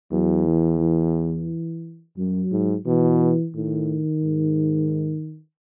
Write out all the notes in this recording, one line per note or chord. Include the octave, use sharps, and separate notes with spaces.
E2 F#3
E3
E3
F#2 F#3
G#2
B2 E3
A2 D#3
G#2